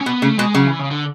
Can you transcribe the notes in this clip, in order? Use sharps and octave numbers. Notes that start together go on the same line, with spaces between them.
C#4
B2 B3
C#3 A3
B2 G#3
C#3 F#3
E3
C#3
D3